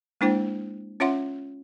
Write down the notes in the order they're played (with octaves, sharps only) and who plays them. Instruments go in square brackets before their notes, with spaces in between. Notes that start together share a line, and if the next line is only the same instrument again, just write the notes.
[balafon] G#3 A#3 D4 E4 C5 G5
C#4 F4 C#5 E5 F#5 C6